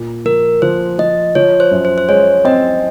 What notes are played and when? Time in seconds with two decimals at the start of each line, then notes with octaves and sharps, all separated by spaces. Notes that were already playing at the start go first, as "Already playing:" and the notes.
Already playing: A#2
0.25 F3 A#4
0.62 F3 C5
0.99 F3 D#5
1.35 F3 C#5
1.60 C5
1.71 F#2
1.85 C5
1.98 C5
2.08 G#3 C#5
2.45 C4 D#5